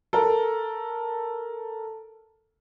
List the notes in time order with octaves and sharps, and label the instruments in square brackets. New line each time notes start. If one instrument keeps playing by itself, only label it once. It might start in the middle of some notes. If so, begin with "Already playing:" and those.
[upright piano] A4 A#4